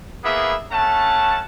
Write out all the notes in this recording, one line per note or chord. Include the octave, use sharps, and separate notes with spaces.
A#3 B3 E4 G#4 E5
A3 C#4 F#5 A5